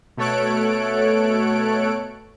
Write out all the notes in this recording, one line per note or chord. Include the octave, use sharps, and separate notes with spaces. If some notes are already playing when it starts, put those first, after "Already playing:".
B2 A3 A4 C#5 F#6 D7